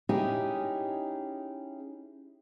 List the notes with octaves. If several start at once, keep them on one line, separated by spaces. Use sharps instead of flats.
C#4 D#4 E4 G4 G#4